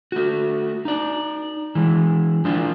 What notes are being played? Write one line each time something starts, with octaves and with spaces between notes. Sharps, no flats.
A3 F#4
D#4 D5
E3 G#3
F3 D4 F4